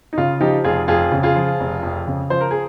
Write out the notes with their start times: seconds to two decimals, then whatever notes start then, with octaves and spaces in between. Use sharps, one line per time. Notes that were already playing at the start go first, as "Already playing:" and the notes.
0.13 D#4
0.18 C#3 F4
0.41 F3 D#4 G4
0.64 F1 F4 G#4
0.88 F2 F4 G#4
1.12 C#3
1.23 F4 G#4
1.36 F3
1.60 F1
1.83 F2
2.07 C#3
2.30 F3 C5
2.41 A#4
2.51 G#4